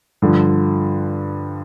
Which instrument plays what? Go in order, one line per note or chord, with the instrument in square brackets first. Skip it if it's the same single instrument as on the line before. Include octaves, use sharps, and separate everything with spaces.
[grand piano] G2 D3 F3